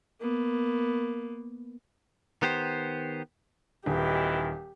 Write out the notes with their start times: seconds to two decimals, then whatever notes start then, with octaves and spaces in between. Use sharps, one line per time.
0.21 A#3 B3
2.42 D#3 B3 G4 C5
3.86 D#1 B2 D#3 E3 G4